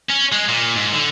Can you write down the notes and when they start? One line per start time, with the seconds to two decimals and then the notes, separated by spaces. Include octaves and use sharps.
0.09 C#4
0.32 G#3
0.49 A#2
0.76 G#2
0.93 D3